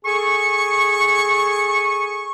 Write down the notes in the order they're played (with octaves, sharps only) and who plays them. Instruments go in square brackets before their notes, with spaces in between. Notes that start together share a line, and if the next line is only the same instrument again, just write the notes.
[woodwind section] G#4 A4 G#5 C#6